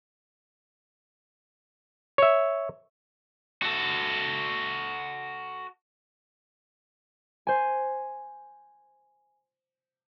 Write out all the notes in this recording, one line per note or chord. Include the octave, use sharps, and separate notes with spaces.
C#5 E5
F#4 A4
C5 G#5